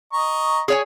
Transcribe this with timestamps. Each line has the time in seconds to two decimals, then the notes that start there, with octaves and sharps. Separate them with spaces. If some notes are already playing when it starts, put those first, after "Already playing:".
0.13 D#5 A#5 C#6
0.68 G#4 C#5 G#5